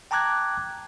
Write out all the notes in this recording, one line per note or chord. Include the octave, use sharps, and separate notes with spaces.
G5 A5 A#5 D6 F#6 G#6